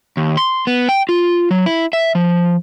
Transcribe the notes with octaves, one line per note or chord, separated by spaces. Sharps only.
D#2
C6
B3
G5
F4
F#3
E4
E5
F3